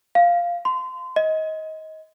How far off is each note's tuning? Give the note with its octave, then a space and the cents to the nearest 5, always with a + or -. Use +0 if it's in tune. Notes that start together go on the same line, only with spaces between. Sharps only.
F5 -5
C6 -25
D#5 +20